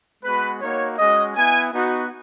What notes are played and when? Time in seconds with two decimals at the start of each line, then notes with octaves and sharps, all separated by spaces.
0.23 G#3 B3 F#4 B4
0.61 A#3 D#4 F#4 C#5
0.98 G#3 C#4 F#4 D#5
1.35 B3 E4 G#5
1.73 B3 D#4 F#4